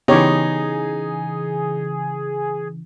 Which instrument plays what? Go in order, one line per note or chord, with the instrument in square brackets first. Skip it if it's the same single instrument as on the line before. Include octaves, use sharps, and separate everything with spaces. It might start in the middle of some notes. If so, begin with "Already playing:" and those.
[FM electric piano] C#3 E3 [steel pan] B3 G4 C#5 [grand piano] D#4 [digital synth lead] G#4